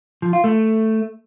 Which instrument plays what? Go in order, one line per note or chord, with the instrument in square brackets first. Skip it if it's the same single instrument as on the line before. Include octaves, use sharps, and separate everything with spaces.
[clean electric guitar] F3
F4
A3